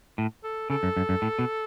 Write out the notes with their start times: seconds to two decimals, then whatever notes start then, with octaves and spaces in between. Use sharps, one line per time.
0.18 A2
0.44 A4
0.70 C#3 A4
0.83 F#2
0.97 F#2
1.09 F#2
1.22 A2
1.39 B2